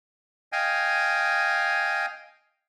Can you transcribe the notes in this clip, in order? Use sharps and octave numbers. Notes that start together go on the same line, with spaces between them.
D#5 F5 G5 G#5